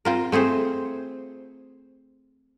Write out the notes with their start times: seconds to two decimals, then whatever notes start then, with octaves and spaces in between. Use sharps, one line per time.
0.05 C4 F4 A#4
0.32 A3 C4 G#4 C5